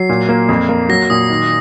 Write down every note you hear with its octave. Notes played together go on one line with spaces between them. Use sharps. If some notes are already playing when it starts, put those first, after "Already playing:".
Already playing: F#3 C7
A#2
A#3
F2
A#3
F#3 A#6
A#2 D#6
D#3